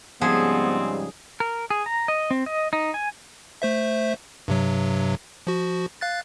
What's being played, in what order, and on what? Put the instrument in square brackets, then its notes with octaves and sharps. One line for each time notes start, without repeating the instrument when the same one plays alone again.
[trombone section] G#2 C#3 G3 [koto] F3 G#4 [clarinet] B3 [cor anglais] C4
[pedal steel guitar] A#4
G#4
A#5
D#5
C4
D#5
D#4
G#5
[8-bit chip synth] A3 C5 E5
G2 C3 F#3
F3 F#4
F5 F#6 A6